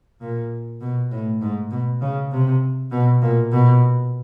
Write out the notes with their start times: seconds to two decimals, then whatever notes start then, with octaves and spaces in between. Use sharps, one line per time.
0.21 A#2
0.81 B2
1.11 A2
1.42 G#2
1.71 B2
2.01 C#3
2.32 C3
2.92 B2
3.22 A#2
3.52 B2